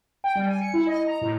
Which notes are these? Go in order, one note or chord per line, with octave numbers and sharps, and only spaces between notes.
G5
G3
G#5
C#7
E4
D#5
A#5
A2